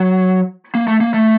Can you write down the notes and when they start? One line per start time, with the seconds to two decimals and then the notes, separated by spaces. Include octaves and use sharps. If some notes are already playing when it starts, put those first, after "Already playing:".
Already playing: F#3
0.75 A#3
0.88 A3
1.01 A#3
1.14 A3